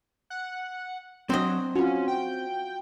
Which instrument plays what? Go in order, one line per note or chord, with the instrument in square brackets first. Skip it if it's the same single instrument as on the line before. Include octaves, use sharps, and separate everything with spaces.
[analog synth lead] F#5
[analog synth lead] F#3 [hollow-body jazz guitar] C4 D4 D#5
[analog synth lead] C#4 [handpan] F4 F#4
[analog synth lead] G5